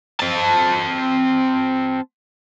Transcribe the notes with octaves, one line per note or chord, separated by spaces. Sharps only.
C4 A5